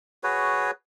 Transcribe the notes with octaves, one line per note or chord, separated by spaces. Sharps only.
F#4 G#4 B4 C#5